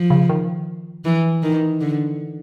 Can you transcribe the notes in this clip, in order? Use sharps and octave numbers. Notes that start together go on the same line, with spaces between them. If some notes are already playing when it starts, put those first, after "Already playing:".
Already playing: F3
C#3
D#3
E3
D#3
D3